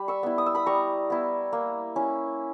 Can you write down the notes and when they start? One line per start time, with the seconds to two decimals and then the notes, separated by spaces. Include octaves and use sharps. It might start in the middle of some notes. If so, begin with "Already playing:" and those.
Already playing: G3 B5
0.08 C#6 E6
0.23 B3 E4
0.38 D#6
0.46 E6
0.55 B5 D#6
0.66 G3 A#5 C#6
1.10 B3 E4
1.53 A#3
1.96 C#4 E4